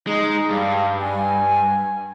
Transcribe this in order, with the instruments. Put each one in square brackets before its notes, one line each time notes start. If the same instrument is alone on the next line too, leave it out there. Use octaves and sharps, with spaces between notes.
[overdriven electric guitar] G#3 [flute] D#4
[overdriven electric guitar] G2 [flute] F5
[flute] G#5